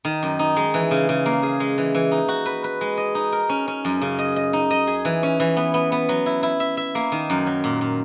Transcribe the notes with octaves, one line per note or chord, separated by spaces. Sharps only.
D#3
F#2
D#4
G#3
E3
C#3
C#3
A#3
G#4
G#3
E3
E3
D#4
F#4
B4
B4
G#3
D#5
D#4
A#4
C#4
C#4
F#2
C#3
D#5
D#5
D#4
D#5
G#4
E3
C#4
E3
B3
B3
B3
F#3
E4
E4
E5
E5
A#3
D#3
F#2
F#3
A#2
A#2